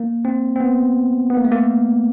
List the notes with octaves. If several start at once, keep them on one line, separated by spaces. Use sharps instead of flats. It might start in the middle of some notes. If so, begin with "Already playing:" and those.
Already playing: A#3
C4
C4
B3
B3
A#3
A3
A#3